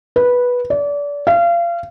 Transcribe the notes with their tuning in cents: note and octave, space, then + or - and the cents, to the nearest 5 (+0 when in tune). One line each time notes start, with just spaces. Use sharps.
B4 -10
D5 -30
F5 -30